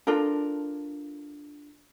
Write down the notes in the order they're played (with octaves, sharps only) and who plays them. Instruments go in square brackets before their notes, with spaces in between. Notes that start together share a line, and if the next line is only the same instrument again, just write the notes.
[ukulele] D4 F4 A4 A#4